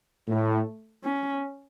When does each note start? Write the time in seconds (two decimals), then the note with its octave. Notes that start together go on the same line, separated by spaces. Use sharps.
0.28 A2 A3
1.04 C#4